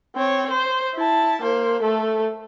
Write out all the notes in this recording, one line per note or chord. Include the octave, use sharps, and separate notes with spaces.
C4 C#5
C5
E4 A5
A#3 C5
A3 A4